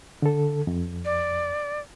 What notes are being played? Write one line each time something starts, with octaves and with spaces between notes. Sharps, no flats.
D3 A4
F2
D5